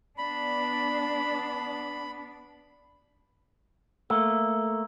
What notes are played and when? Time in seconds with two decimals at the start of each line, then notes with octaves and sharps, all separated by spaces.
0.18 B3 D4 B5
4.10 A3 A#3 E6